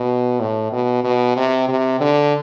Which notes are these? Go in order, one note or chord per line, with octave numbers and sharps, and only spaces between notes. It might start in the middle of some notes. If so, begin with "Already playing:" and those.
Already playing: B2
A2
B2
B2
C3
C3
D3